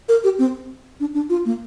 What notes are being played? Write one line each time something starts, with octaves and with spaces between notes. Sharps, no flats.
A#4
G4
C4
D4
D4
F4
A#3